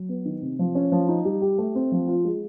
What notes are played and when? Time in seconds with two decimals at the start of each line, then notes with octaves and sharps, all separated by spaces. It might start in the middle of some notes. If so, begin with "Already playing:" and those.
Already playing: F#3
0.09 B3
0.25 D#3
0.42 C3
0.59 F3
0.75 C#4
0.92 F3
1.08 D#4
1.25 G3
1.41 G4
1.58 A3
1.75 C4
1.92 F3
2.08 F4
2.25 G#3